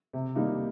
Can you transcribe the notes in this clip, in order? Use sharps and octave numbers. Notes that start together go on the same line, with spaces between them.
C3
D#3 G3 A#3 D#4